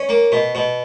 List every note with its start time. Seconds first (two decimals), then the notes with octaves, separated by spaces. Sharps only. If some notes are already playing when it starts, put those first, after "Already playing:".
Already playing: C#4
0.09 A#3
0.32 B2
0.55 B2